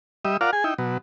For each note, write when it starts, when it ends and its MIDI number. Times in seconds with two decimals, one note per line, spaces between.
0.25 0.37 55
0.25 0.37 75
0.25 0.37 76
0.41 0.51 65
0.41 0.51 70
0.41 0.51 74
0.41 0.51 77
0.41 0.51 78
0.53 0.64 68
0.53 0.64 80
0.64 0.74 63
0.64 0.74 64
0.64 0.74 79
0.78 0.98 47
0.78 0.98 54